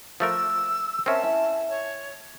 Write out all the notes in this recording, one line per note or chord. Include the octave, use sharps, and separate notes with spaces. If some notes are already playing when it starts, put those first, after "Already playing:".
F3 A3 A#4 E6
C4 C#4 A#4 D#5 E5 A5
E4 E5 G#5
C#5